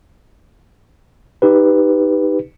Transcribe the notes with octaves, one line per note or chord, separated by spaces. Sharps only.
D#4 G4 B4